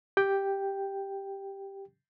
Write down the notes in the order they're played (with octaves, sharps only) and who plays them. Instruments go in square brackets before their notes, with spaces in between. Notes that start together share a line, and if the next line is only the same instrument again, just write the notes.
[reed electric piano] G4 G5